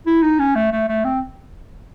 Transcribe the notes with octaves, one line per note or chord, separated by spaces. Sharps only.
E4
D#4
C#4
A3
A3
A3
C4